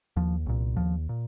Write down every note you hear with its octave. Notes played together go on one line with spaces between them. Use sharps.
D#2 F3
C2 A#2
D#2 F3
A#2